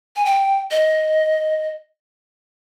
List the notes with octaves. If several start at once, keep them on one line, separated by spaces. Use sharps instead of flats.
G#5
G5
D#5